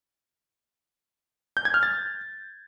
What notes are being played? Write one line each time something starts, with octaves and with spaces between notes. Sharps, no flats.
G6
G#6
F6
A6